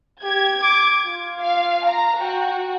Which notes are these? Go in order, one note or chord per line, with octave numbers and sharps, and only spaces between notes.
G4 G#6
D6
F4
F5
A#5
F#4 G5